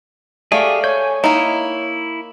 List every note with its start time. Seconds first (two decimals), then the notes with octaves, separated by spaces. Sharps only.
0.52 A3 G4 G#4 D5 F5 C#6
0.84 C#5 G#5 C#6 G6
1.24 A#3 D#4 E4